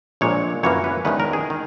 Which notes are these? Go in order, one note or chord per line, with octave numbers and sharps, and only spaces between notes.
A#1 A#2 G#3 C#5
F#2 E3 A#3 C#5
B4
E2 D#3 G#3 C#4 B4
A#4
G#4
D#3